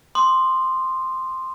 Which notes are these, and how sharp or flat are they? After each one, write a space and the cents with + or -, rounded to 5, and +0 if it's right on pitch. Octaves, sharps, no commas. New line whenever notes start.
C6 +0 D#6 -45